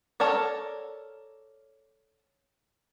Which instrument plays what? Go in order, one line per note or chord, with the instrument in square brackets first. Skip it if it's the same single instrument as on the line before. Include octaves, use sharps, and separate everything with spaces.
[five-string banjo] A4 A#4 C#5 D5